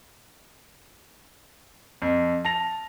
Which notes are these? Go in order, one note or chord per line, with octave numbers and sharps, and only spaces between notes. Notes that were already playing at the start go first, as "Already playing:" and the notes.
F2
A5 A#6 F7